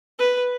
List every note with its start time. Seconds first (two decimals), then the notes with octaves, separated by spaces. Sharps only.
0.19 B4